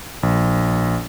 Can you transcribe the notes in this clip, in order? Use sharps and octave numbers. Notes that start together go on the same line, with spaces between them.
A#1